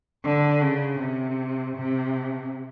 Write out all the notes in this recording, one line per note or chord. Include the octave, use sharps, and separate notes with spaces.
D3
C#3
C3
C3